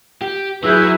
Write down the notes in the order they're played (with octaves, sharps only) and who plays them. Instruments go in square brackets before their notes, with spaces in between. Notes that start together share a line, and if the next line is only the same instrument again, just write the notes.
[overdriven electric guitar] G4
[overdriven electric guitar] F#3 [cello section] E4 G#4 B4 [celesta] E6 F#6 G6